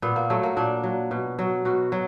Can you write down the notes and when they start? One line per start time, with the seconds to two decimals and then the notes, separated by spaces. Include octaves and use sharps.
0.02 A#2 B3
0.16 A#3
0.30 F#3 A3
0.43 A#3
0.57 A#2 D4
0.83 F#3
1.11 B2
1.39 F#3
1.65 B2 F#4
1.92 F#3